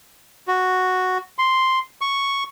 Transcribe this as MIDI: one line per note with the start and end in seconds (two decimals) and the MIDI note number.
0.48 1.18 66
1.39 1.79 84
2.01 2.44 85